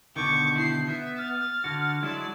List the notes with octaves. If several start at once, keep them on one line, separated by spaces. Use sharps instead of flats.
B2 D3 D#3 C#6 D6 G6
E4 C7
B3 E5
F6 A6
D3 F#4
F#3 G#3 E4 D5 A5